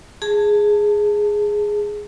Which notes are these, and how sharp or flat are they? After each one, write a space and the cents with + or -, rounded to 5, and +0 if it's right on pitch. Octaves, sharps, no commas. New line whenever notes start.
G#4 +0 A5 +15